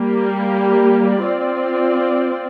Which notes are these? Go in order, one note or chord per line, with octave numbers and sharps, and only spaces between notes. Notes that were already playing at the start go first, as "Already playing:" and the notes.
Already playing: G3 A#3 G4
C4 F4 D5